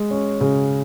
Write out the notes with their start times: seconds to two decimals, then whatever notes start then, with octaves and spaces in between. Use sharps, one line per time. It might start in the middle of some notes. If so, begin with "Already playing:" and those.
Already playing: G#3
0.11 C#4
0.41 C#3